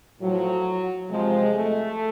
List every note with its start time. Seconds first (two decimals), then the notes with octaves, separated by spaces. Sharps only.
0.21 A2 F3 F#3
1.09 C3 F3 G#3
1.54 A3